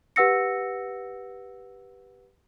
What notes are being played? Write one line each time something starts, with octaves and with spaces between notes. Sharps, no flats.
G4 B4 F#5 E6 A#6 C#7